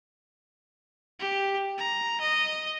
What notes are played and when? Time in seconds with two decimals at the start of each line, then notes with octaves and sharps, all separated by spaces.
1.20 G4
1.78 A#5
2.21 D#5